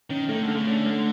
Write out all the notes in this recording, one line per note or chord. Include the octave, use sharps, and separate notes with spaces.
D#3 C#4
D#3 A3
D3
A3
C#3
D3 C#4
A3